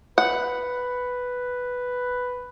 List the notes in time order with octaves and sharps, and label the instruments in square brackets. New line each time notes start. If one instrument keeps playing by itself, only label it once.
[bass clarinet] B4 [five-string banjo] F#5